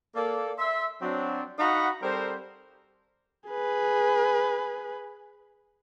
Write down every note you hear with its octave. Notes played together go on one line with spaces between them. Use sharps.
A#3 A4 D5
E5 C6
F#3 C4 D4
D#4 F#4 F5 F#5 A#5 B5
G3 C4 A4 A#4 C5
G#4 B4